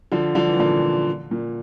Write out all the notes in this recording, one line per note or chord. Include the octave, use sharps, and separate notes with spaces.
D3 F3
D3 F3
E3
A#2 D3
A#2